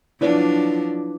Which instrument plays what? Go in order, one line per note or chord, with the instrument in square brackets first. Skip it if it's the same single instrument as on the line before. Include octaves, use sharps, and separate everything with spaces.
[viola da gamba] F3 F#3 D4 [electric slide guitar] E4 B4 D5